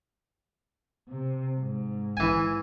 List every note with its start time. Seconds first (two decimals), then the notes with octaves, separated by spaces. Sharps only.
1.08 C3
1.60 G#2
2.17 E3 G#5